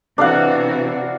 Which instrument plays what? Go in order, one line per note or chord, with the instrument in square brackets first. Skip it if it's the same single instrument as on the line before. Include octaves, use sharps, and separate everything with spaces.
[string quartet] C3 E3 F#4 [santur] D4 F5 F#5